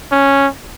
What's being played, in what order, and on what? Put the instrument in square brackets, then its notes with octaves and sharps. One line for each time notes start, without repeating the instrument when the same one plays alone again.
[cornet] C#4